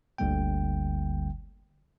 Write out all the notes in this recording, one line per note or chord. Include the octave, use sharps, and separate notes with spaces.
G1 D2 D3 G3 A#3 G5